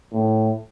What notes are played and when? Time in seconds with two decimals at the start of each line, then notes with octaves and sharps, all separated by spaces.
0.12 A2